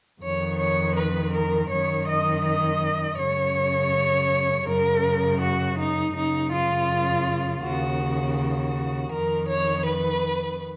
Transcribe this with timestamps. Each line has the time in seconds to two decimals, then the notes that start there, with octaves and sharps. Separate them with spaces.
0.21 F2 D#3 C#5
0.58 C#5
0.95 B4
1.32 A#4
1.69 F#2 D#3 C#5
2.06 D#5
2.44 D#5
3.18 F#2 C#3 C#5
4.66 F#2 C#3 A#4
5.40 F#4
5.77 D#4
6.14 F#2 C#3 D#4
6.51 F4
7.62 D#2 C#3 F#4
8.37 F#4
9.11 F2 D#3 A#4
9.48 C#5
9.85 B4